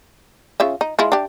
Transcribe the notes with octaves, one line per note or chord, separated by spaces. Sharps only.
C#3 F4 E5
D#4
G#3 E4 F4
D4 G4